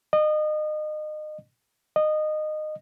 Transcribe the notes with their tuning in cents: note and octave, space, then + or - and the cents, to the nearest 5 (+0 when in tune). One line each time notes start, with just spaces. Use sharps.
D#5 -30
D#5 -20